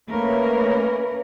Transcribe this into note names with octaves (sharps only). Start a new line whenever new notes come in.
A3 A#3 C#4 A#4 B4